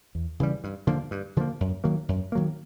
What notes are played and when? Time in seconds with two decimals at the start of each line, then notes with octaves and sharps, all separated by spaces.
0.15 E2
0.40 C#3 E3 G3
0.64 G2
0.87 D3 F3 A#3
1.11 G2
1.36 D3 F3 A#3
1.61 F#2
1.84 D#3 F#3 A#3
2.09 F#2
2.32 D#3 F#3 A#3